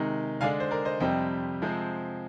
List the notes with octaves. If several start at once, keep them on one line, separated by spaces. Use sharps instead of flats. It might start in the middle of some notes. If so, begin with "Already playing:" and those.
Already playing: C3 D#3 G#3 D#4
D3 G#3 D4 F5 G#5
C5
A#4 D5
C5 D#5
F2 C3 G3 C4 D#5 G5
C3 F3 G#3 C4